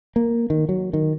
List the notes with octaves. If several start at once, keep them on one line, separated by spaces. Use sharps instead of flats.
A#3
D#3
F#3
D#3